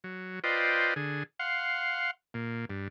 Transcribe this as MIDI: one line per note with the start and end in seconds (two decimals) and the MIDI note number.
0.04 0.39 54
0.44 0.94 65
0.44 0.94 71
0.44 0.94 72
0.44 0.94 74
0.44 0.94 75
0.44 0.94 79
0.96 1.23 50
0.96 1.23 68
1.39 2.11 77
1.39 2.11 78
1.39 2.11 84
2.34 2.65 46
2.70 2.88 43